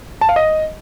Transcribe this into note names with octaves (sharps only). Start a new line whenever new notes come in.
A5
F5
D#5